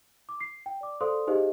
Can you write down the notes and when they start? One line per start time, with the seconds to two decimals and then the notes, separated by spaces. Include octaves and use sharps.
0.29 D6
0.41 C7
0.66 G5
0.81 D5 D6
1.01 A4 C5 D5 F5 C6 D#6
1.27 D#4 G4 G#4 C5 D#5 F5